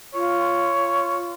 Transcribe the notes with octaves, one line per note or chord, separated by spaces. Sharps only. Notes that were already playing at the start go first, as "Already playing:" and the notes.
F4 C#5